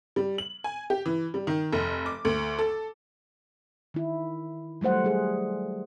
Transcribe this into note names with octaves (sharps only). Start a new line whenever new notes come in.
G3
F#7
G#5
G4
E3
G3
D#3
F1
D6
D2
A4
D#3 E4
F#3 G3 A3 C5 F#5
G3 G#4